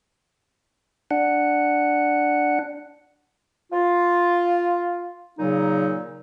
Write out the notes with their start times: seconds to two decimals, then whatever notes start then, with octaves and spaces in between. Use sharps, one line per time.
1.11 D4 F#5
3.72 F4
5.39 A#2 C#3 F#3 D#4